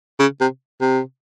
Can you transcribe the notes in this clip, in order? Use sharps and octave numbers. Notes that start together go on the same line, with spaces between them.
C#3
C3
C3